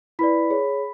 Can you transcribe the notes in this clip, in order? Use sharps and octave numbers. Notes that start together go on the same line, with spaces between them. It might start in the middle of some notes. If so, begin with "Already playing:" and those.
E4 B4 D5 B5 B6
G#4 C#5